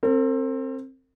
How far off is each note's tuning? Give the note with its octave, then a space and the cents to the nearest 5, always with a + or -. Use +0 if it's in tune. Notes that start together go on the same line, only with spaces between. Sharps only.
C4 +20 A#4 -45